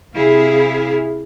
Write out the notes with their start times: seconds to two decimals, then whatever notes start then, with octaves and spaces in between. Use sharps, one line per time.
0.14 C3 E4 G#4 F5